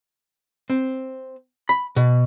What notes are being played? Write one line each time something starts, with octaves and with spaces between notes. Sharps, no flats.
C4
B5
B2